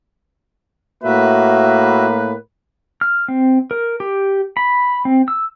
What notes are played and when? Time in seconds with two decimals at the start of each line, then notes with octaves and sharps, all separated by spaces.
1.04 A2 A#3 F#4 B4 E5
3.01 F6
3.28 C4
3.71 A#4
4.00 G4
4.57 B5
5.05 C4
5.28 E6